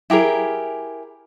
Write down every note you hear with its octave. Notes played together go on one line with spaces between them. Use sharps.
E4 G4 G#4 A#4